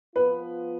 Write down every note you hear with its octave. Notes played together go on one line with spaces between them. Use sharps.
F3 B3 F4 B4